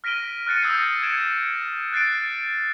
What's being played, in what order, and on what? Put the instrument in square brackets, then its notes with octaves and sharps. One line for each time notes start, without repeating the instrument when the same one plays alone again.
[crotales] F6 A#6 B6 D7 D#7 G7
F6 F#6 A6 C#7 D#7
D#6 E6 G6 G#6 A#6 C7
G#6 A#6 C#7 D7 E7
F#6 A6 C7 D7